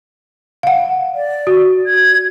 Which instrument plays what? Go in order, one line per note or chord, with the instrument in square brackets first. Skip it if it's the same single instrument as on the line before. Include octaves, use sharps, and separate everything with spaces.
[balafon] F5 F#5
[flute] D5
[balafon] F#4
[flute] G#6